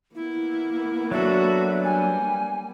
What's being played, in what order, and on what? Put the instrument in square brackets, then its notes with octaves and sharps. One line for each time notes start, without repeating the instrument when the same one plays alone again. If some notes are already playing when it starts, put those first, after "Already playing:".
[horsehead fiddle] A#3 B3 [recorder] E4
[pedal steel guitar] F#3 D4 A4 [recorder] F#4 [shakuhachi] E5
[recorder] G3 [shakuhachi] G#5